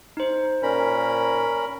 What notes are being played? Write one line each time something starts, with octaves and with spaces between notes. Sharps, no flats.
D#4 C5
A#2 C#4 A#4 B5